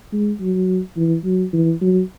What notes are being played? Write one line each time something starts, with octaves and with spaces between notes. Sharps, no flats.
G#3
F#3
E3
F#3
E3
F#3